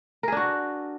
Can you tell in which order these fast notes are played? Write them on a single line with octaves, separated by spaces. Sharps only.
A#4 G#4 D4 F#4